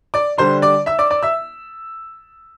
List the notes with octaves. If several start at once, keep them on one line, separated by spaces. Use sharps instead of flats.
D5 D6
D3 G3 D4 C5 C6
D5 D6
E5 E6
D5 D6
D5 D6
E5 E6